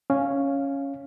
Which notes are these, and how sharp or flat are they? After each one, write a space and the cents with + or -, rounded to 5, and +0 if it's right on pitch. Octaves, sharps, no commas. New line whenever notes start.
C#4 +0 F5 +0